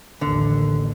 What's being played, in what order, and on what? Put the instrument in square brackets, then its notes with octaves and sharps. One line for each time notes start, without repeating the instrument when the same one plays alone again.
[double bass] A1 D#2 [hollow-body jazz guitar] D3